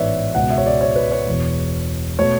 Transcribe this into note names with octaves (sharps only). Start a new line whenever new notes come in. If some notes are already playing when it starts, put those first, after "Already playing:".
Already playing: A1 G#2 E3 B3 B4 C#5 D5 E5
C#2 B2 G#3 F#5
E5
C#5
D5
C#5
B4
C#5
E1 E2 B2
B2 A3 C#5